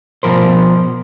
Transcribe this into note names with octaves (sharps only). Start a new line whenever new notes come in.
B2 D#3 F3 A#4 C5